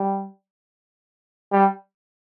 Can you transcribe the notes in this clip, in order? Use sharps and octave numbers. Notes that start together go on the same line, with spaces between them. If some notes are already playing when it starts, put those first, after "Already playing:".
Already playing: G3
G3